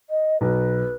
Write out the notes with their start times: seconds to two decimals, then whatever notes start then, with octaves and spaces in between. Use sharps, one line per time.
0.10 D#5
0.41 B1 B4